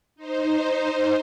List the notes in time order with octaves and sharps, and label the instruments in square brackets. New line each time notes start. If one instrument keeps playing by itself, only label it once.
[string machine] D#4 C5